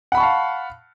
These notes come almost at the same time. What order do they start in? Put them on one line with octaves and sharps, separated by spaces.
F#5 B5 C#6 A5 F5